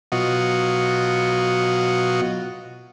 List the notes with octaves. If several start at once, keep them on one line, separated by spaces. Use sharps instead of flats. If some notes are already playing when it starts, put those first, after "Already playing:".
B2 F#3 F4 F#4 D#5